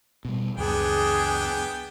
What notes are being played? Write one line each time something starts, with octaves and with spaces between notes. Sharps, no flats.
B2 G3
C#2 F#2 B3 D4 G#4 G5